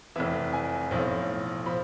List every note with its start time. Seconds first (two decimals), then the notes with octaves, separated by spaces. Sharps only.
0.16 F1 F2 E3 E5
0.53 G#5
0.91 B1 A2 F3
1.66 F3 B5